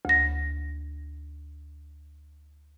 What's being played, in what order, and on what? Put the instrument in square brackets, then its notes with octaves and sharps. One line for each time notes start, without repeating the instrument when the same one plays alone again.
[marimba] D2 A#6